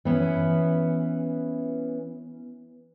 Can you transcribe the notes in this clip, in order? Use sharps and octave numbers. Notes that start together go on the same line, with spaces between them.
E3 B3 C#4